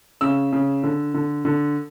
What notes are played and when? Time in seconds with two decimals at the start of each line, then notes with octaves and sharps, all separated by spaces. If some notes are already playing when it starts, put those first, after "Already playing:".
0.21 C#3 E6
0.53 C#3
0.83 D3
1.14 D3
1.45 D3